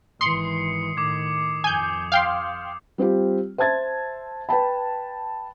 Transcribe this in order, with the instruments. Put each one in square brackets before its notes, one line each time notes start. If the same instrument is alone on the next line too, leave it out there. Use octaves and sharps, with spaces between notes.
[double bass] G#1 E3 [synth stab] C6 [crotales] D#6 C7 C#7
[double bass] A2 D#3 [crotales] D6 G#6
[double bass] F2 [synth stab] G#5 G6 [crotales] D#6
[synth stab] F5 G5 C6 [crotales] G6
[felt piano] G3 C4 F4 G4
C5 E5 A5 G#6 A6
B4 G5 A5 B5